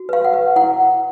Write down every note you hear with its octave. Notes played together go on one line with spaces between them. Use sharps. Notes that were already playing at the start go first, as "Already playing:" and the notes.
Already playing: F#4
B4 F5
F#5
B4
E4 F#5